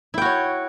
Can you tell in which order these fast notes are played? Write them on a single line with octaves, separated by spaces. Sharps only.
E4 G5 F#4 C#5